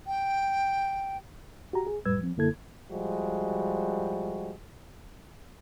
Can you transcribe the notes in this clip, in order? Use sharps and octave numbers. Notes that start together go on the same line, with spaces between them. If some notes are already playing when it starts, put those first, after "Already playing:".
G5
F#4 G4 A#5
G#4
F2 A2 G3 B4 E6 G#6
F3 C4
F#2 D3 A#3 E4 A4 G#6
F3 G3 G#3 F#4